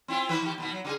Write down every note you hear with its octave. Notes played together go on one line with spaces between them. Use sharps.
C4 E4 F4
D#3 B3 B4
D#3 G4
D#2 B2 B3
F#3
C#3 F#4 G#4